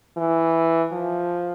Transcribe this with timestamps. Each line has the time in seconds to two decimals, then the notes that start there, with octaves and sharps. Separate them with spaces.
0.17 E3
0.92 F3